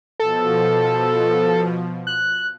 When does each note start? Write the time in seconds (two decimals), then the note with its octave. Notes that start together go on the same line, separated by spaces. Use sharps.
0.20 B2 F3 A4
2.07 F#6